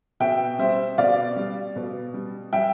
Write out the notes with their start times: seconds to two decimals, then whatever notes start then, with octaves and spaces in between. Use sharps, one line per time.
0.20 B2 E5 G5
0.59 G3 C5 E5
0.98 B2 D5 F5
1.36 G3
1.76 B2
2.14 G3
2.53 G3 E5 G5